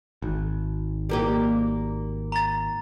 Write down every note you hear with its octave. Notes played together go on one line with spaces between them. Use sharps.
G#1
G3 A#3 G4
A#5 A6